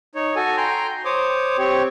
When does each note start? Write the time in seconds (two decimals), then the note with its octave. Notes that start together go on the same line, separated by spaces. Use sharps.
0.15 D#4 C#5
0.36 F#4 A4 G#5
0.57 G5 A#5 C6
1.05 C5 C#5 D6 D#6
1.58 C4 G4 C#5